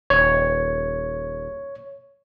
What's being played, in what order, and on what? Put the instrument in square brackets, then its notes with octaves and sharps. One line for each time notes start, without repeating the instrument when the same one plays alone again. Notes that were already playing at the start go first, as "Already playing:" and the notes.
[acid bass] D#1 [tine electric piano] C#5